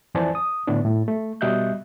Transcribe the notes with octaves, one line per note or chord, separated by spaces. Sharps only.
F2 E3 C5 D5 G#5 A5
D#6
A2 D3 B3 D4
A2
A3
B2 G3 D#5 E5 F#6 G6